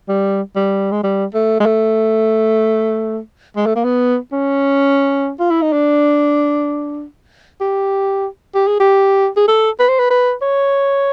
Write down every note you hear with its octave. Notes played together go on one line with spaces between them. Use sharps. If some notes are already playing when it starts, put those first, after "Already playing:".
G3
G3
G#3
G3
A3
G#3
A3
G#3
A3
A#3
B3
C#4
F4
E4
D#4
D4
G4
G4
G#4
G4
G#4
A4
B4
C5
B4
B4
C#5